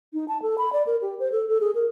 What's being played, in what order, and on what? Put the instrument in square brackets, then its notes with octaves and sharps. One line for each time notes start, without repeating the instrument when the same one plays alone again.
[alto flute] D#4
A5
A4
B5
D5
A#4
G4
C5
A4
A4
G#4
A#4